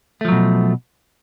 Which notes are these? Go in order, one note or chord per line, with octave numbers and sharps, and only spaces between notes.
B2 F3 F#3 A3